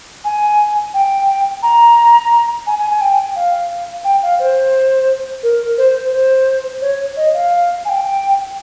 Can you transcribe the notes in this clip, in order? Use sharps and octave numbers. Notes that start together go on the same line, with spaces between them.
G#5
G5
A#5
G#5
G#5
G#5
G5
F5
G5
F5
C5
A#4
C5
C5
C#5
D#5
F5
G#5
G5